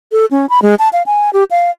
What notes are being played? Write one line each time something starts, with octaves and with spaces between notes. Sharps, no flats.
A4
C#4
B5
G#3
A5
F5
G#5
G4
F5